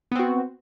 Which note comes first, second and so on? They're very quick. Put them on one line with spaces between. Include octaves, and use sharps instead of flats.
B3 C4 F#4